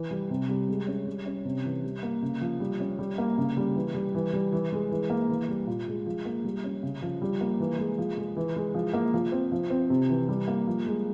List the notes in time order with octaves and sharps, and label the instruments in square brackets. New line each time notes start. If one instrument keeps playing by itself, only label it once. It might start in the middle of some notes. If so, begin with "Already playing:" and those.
Already playing: [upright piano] E3
G3
C3
G3
G#3
C#4
G3
C#4
C3
E3
G3
A#3
C#3
F3
G3
C#4
G3
A#3
C#3
G3
E3
G3
E3
G3
E3
G#3
E3
A#3
E3
G3
A#2
G#3
F3
A#3
G3
C#4
C#3
F3
G3
A#3
E3
G#3
F3
G#3
E3
G#3
F3
A#3
F3
C4
F3
C4
C3
E3
G3
A#3
F3
G#3